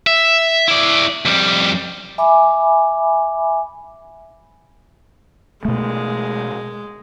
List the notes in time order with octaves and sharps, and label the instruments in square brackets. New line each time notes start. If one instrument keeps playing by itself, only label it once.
[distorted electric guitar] E5
E4 D5
F2 G3
[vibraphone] E5 G#5 B5 D6
[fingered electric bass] B2 A3 [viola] G#3